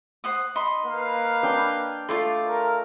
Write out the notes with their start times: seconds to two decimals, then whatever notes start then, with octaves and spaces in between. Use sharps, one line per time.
0.24 C5 F#5 D#6
0.55 D#4 B5 C6
0.86 A#3 B4 F5
1.43 D4 G5 D#6
2.09 A3 F4 D5 C6
2.47 A#4